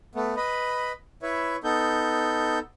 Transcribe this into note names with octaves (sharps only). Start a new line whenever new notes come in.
A3 B3
B4 D#5 B5
E4 B4 C#5 E5
B3 D#4 A4 G6